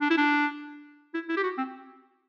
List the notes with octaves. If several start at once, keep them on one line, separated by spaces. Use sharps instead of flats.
D4
E4
D4
E4
E4
G4
F#4
C4